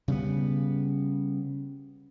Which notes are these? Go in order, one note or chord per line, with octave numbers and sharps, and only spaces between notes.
C#3 G3 A3 B3